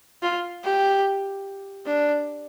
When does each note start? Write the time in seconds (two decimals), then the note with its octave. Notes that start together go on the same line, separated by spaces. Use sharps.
0.22 F4
0.64 G4
1.85 D4